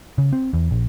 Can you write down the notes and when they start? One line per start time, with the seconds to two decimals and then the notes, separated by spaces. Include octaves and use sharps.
0.18 C#3
0.33 C4
0.53 E2
0.71 A#1